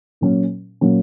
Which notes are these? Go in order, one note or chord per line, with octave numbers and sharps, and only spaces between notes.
A#2 F#3 C#4
A#2 F#3 C#4